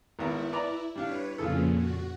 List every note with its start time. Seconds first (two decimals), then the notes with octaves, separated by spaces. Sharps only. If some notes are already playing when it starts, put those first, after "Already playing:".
0.19 G#1 B3 E4 A#4
0.52 B4 D5 A#5
0.96 G3 D4 B4 C#5 F5
1.38 F2 A#2 C#3 F4 G#4 A4
1.74 F#4